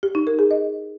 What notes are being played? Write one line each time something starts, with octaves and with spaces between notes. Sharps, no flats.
G4
D#4
A#4
G#4
D#5